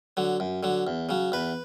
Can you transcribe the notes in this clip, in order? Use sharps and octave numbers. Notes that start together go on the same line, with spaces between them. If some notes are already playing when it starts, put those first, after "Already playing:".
D3 F#3
F#2
D3 F#3
E2
C#3 F#3
E2 B4